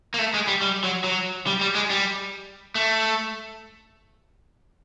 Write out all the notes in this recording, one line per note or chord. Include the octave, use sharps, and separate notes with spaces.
A#3
A3
G#3
G3
G3
F#3
F#3
G3
G3
G#3
G3
A3